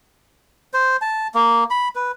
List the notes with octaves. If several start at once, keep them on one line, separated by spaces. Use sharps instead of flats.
C5
A5
A#3
B5
B4